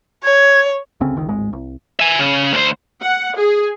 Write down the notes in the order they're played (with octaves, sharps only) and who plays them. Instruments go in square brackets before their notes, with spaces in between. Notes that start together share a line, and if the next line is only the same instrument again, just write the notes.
[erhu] C#5 [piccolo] G#6
[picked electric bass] D#1 D2 C#3 C4
F#1 C#2 D#3
D1 G#1 G#3
C2
[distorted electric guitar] E5 G#5
C#3
D2 C5
[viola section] F#5
G#4